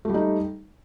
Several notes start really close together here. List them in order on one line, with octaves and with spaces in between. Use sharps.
A3 G3 D#4